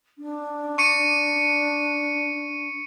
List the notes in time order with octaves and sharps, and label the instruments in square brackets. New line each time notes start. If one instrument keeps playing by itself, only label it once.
[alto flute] D4
[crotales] C#6 C#7 D#7